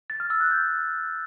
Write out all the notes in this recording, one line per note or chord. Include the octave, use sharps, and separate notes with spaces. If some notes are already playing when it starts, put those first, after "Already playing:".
A6
F6
E6
F#6
G6